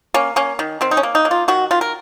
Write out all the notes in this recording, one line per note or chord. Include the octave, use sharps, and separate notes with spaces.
A#3 C#4
A#3 C#4
D#3
D#3 C4
D#4
C#4
A#3
D#4
A#3
F4
D#3 F#4
D#3 F4
A#4